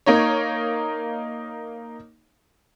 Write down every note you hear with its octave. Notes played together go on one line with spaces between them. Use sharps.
A#3 D#4 C#5